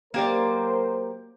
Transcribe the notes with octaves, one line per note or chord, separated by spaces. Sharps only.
F#3 A#3 G4 A#4 C5 D5